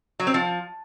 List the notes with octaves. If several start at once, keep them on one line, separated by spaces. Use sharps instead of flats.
F#3
C4
F3